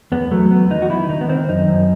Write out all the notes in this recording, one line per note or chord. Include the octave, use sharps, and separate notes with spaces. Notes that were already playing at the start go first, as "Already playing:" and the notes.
E2 B3
F#3 A3
E2 B3
D#3 D#4
F#4
D#3 E4
D#3 D#4
B3
D#3 C4
F#2 D#4
F#2